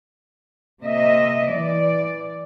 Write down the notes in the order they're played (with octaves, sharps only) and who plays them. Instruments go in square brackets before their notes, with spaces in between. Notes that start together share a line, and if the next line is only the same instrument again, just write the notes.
[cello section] C3 A#3 D#5 E5
E3 D5